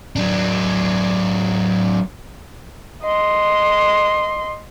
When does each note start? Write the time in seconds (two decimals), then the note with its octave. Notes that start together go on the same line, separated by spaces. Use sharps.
0.16 F#3 D4
3.03 D#5 C6